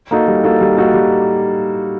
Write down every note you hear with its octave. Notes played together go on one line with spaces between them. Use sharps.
A#3 D#4 F#4 A4
G3
A#3 D#4 F#4 A4
G3
A#3 D#4 F#4 A4
G3